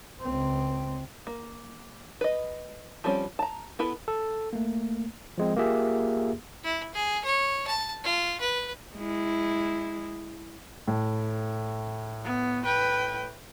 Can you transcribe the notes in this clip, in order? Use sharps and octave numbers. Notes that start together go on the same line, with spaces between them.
C#2 C4
A#3
B4 D#5
F3 G3 C4 C#4
A5 A#5
B3 E4 A4 B4
A4
A3 A#3
F3 G#3 C4
A#3 F4 G4 G#4 E5
E4
G#4
C#5
A5
F4
B4
G#3 E4
A2
B3
B4 G5